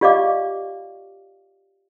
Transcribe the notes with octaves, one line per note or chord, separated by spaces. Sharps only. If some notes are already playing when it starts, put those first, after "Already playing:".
F4 G4 D5 D#5 F5 D6